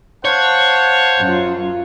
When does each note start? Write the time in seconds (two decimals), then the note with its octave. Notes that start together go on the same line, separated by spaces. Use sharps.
0.25 C5 C#5 F5 F#5 A5
1.20 F#2 F4